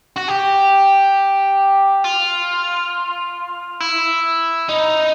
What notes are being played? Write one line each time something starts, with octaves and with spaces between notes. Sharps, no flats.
F#4
G4
F4
E4
D#4